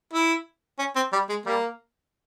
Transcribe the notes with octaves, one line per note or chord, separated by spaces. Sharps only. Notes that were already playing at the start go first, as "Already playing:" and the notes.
E4
C#4
C4
G3
G#3
G3 A#3